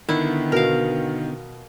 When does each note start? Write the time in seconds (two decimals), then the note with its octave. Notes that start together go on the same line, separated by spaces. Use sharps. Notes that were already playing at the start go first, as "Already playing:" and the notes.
0.09 D3 D#3 B3 E4
0.52 B2 A#4 F5